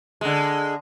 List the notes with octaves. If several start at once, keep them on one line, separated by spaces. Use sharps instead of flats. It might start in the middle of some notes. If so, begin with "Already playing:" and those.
D3 G#3